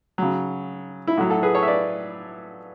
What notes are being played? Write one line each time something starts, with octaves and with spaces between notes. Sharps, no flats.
C#3 F#3
E4
A2 F#3 F#4
F#4 A4
G#4 B4
A4 C#5
E5
B4 D5